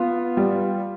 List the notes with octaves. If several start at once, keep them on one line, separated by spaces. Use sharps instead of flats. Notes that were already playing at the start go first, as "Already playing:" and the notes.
Already playing: B3 F4
G3